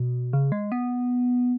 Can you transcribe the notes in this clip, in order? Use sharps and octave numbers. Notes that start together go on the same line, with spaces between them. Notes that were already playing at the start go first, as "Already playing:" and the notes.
Already playing: B2
C#3
G#3
B3